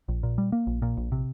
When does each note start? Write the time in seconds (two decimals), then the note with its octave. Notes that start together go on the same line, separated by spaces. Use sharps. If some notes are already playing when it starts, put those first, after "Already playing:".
0.08 A#1
0.23 A#2
0.38 G3
0.52 A#3
0.67 A#1
0.82 A#2
0.97 A#1
1.12 C3